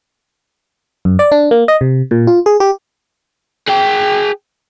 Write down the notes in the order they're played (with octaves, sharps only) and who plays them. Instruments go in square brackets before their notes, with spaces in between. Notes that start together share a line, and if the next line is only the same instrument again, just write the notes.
[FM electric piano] F#2
D5
D4
A#3
D#5
C3
A#2
F4
G#4
G4
[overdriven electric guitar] G#4 G5